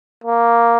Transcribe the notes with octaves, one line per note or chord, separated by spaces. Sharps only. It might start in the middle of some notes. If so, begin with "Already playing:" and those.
A#3